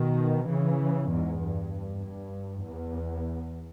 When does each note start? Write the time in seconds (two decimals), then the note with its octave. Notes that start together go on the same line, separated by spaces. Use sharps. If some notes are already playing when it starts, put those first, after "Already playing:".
Already playing: B2 D#3
0.48 C#3 E3
1.10 E2 G#2
1.40 G2
2.03 G2
2.65 E2